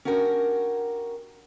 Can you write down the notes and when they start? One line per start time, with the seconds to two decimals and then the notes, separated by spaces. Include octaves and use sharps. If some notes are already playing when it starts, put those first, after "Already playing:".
0.05 C#4 D4 F#4 G4 A#4